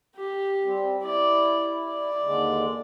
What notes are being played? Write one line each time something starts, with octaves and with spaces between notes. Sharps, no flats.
G4
G3 C4
E4 D5
D5
D#2 D3 G#3